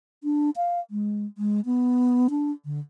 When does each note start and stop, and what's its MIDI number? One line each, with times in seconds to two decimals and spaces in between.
0.24 0.50 62
0.56 0.80 77
0.91 1.25 56
1.38 1.60 56
1.65 2.28 59
2.30 2.51 62
2.65 2.79 50